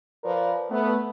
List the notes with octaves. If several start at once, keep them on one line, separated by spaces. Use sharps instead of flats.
F3 A#4 B4 D5
A3 B3